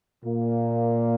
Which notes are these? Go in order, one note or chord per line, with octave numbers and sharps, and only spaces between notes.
A#2 A#3